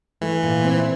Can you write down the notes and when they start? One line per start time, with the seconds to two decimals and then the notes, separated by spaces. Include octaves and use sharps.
0.21 E3 A3
0.43 A#2
0.64 C4